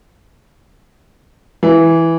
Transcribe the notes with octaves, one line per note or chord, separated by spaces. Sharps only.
E3